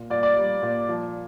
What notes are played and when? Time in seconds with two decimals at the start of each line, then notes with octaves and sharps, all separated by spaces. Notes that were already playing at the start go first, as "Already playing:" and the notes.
Already playing: A#2
0.10 A#2 D5
0.23 D5
0.37 G3
0.63 A#2
0.89 F3